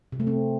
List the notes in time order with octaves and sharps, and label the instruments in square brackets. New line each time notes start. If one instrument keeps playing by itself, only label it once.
[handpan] C3
A3
C4